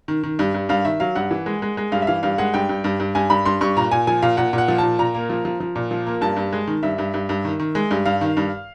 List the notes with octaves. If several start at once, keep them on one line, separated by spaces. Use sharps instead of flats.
D#3
D#3
G2
G2
G2 F5
D#3 E5
F#3 F5
G2 F#5
E3
G#3
G#3
G#3
G2 F5
E5
E3 F5
G2 F5
G#3 F#5
G2 G5
G2
G2
G2
G2 G#5
G2 B5
G2 C6
G2 C#6
A#2 A#5
A#2 G#5
F3 G#5
A#2 F5
A#2 F#5
A#2
F#5
F3
A#2 A5
A#2 A#5
A#3
F3
F3
F3
A#2
F3
A#3
G2 A5
G2
G#3
D#3
G2 E5
G2
G2
G2
D#3
D#3
G#3
G2
G2 F5
D#3
G2